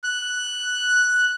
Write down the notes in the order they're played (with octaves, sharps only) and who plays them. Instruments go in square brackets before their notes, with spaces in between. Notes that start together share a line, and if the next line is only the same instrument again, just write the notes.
[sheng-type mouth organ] F#6